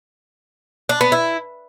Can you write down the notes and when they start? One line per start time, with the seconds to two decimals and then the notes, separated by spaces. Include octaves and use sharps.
0.89 D4
1.01 B3
1.12 E4